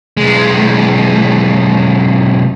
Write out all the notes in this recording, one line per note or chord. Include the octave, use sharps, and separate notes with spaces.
B1 G#3